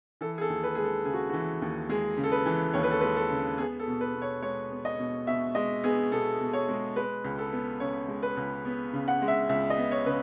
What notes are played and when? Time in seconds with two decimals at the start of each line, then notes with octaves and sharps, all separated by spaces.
0.21 E3 A4
0.38 G#4
0.41 A4
0.50 D#2
0.64 B4
0.75 G#3 G#4
0.84 A4
1.05 C#3 G#4
1.14 F#4
1.29 E3 F#4
1.62 D#2
1.89 G#3 G#4
2.17 C#3
2.24 A4
2.32 B4
2.46 E3
2.73 D#2 C#5
2.83 B4
2.91 A4
3.01 G#3 B4
3.16 A4
3.31 C#3
3.58 B3 G#4
3.79 A4
3.87 B2
4.01 B4
4.15 B2
4.22 C#5
4.42 G#3 C#5
4.71 B3
4.85 D#5
4.99 B2
5.27 B2 E5
5.55 G#3 D#5
5.84 B3 G#4
6.12 B2 A4
6.40 B2
6.53 C#5
6.69 G#3
6.96 G#3 B4
7.24 C#2
7.38 A4
7.53 B3
7.80 C#3 C#5
8.08 G#3
8.23 B4
8.37 C#2
8.65 B3
8.93 C#3
9.08 F#5
9.22 G#3
9.28 E5
9.49 C#2 E5
9.70 D#5
9.77 B3
9.91 C#5
10.06 C#3 B4